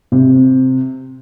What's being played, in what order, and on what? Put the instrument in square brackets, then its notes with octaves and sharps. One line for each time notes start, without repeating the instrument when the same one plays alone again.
[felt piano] C3